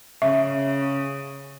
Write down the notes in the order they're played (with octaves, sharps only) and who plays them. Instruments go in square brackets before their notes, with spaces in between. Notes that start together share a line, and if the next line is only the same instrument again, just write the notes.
[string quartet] C#3 [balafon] E5